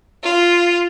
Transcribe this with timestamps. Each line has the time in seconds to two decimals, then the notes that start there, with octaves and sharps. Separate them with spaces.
0.23 F4